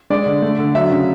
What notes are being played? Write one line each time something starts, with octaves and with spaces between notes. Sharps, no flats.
G#3 D5
D3
A3
D3
F#3 E5
C#3